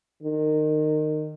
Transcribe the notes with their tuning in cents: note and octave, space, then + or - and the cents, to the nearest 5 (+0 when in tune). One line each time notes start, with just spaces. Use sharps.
D#3 -25